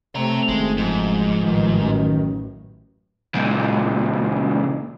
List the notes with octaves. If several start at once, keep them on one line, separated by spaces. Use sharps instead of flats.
C3 A3 C4 C#5 A#5
F#1 D#3 G#3
G#2 F3
G#3
A1 D#3
F#2
C#2 A#2